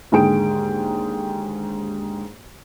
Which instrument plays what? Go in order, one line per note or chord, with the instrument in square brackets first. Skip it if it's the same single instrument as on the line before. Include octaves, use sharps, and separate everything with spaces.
[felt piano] D#2 G#2 D3 G#4 G5 D7